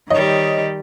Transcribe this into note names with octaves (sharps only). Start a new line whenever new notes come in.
D#3 G3 C#5 D#5